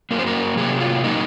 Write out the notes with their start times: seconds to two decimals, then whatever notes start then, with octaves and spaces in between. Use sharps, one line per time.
0.11 F#2 D#3 F#3 A#3 A#4
0.19 C5
0.27 A#4
0.57 C3 F#3 A#3 G#4
0.80 F4
1.04 A#2 F#3 A#3 D#4